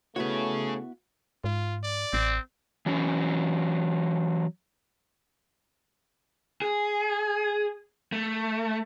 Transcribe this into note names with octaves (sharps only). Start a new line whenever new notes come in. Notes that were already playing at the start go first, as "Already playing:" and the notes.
C#3 A3 B3 E4 F#4 G#4 C#5
G#2 F4
D5
A1 C4
E3 F#3 C#4
G#4
A3